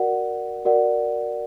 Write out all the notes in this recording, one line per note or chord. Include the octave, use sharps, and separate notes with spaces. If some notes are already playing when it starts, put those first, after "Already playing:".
Already playing: F#4 A#4 D5 F#5
F#4 A#4 D5 F#5